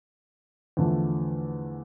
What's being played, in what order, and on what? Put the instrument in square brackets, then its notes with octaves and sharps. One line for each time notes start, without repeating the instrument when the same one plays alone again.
[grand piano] E2 D3 F3 A3